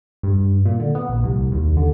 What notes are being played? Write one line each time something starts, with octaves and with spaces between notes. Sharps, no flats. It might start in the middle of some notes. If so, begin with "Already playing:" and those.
G2
A#2
D3
B3
A#1
C2
D#2
D3